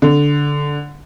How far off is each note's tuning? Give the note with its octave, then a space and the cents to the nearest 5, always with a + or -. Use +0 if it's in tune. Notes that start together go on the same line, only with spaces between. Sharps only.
D3 -10